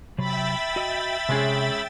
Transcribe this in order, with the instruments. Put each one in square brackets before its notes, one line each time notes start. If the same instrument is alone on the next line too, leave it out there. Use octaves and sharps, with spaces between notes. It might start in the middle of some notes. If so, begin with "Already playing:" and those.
[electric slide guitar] C3 F#3 [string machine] E5 G5 A6 [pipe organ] B5
[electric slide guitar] F#4 D#5
[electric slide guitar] C3 [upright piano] G#3 C#4 G#4